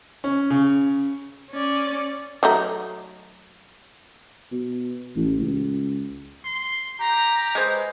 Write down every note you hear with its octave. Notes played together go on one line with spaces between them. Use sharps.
C#4
C#3
C#4 D5
F#3 A3 D#4
B2
A1
C#2
C6
G4 A#5
G#3 B4 C5